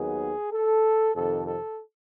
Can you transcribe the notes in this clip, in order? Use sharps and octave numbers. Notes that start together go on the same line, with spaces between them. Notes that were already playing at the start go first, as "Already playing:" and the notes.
Already playing: D#2 D#3 F#3 B3 G#4
A4
F2 C3 D#3 A4
A4